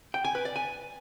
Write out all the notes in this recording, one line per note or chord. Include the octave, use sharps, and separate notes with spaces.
G5
G#5
B4
D5
G#5